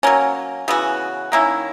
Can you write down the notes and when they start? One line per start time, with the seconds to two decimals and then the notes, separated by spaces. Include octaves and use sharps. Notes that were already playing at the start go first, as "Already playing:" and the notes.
0.03 F#3 A#3 C#4
0.68 C#3 E3 B3 F#4
1.32 D#3 A#3 C#4 E4